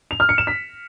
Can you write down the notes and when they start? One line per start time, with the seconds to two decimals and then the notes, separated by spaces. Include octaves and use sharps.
0.11 F7
0.20 F6
0.29 C#7
0.38 E7
0.47 B6